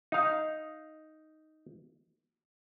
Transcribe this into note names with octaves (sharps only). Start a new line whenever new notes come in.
D#4 F5